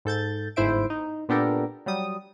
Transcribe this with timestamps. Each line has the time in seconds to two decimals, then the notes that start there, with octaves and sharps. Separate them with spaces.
0.05 G#2 A4 G6 A6
0.56 G1 G#2 E4 C5 E5 D7
0.90 D#4
1.29 A#2 B3 D4 G4 A4 A#4
1.86 F#3 G3 D#6